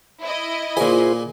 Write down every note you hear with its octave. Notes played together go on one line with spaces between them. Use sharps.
E4 D#5
A#2 F4 G#4 C5 G#5